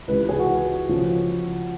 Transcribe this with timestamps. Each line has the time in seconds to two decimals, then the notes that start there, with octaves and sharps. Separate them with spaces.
0.08 C#2 C3 E3 B4
0.29 G#4
0.39 F#4
0.89 C#3 F3